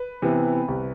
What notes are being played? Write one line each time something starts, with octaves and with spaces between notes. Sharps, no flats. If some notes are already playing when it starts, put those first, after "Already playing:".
Already playing: B4
C3 E3 B3
C2